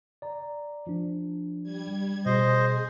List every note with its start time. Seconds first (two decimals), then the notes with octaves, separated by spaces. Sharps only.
0.22 D5 A#5
0.87 F3 D4
1.63 G3 G#6
2.26 B2 G#4 C5 D#5